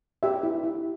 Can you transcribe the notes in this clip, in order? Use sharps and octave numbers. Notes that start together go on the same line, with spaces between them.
G4 E5
E4
E4